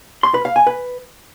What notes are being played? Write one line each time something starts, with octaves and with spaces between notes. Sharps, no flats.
C6
B4
F5
G#5
B4